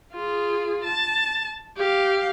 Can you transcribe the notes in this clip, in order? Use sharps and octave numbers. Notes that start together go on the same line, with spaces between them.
F4 G#4
A5
G4 F5